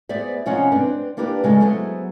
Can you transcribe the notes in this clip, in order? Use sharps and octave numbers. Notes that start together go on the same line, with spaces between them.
B3 G#4 C5 D5 E5
C3 F3 C#4 C#5 D#5 F#5
C4 D4 B4
A#3 D4 E4 G4 A4 B4
C#3 G#3 C#4 A4
F#3 B3 G#4 A4 C5 E5